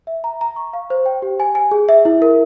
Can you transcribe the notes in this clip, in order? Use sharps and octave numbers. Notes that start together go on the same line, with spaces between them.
E5
A#5
A#5
C#6
F5
C5
G5
G4
G#5
G#5
G#4
E5
E4
A#4